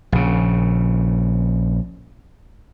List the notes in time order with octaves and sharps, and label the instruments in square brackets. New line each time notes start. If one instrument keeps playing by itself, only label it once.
[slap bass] A#1 C#3